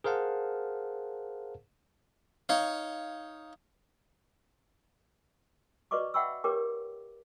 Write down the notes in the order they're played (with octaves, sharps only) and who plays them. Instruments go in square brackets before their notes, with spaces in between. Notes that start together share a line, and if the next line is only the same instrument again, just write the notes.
[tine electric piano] G#4 A#4 C5 F5 F#5 A5
[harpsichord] D#4 C#5 F5
[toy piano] F#4 B4 D5 D#5 C#6 D6
E5 F#5 G5 B5 C#6 E6
G4 A#4 B4 C#5 G5 D6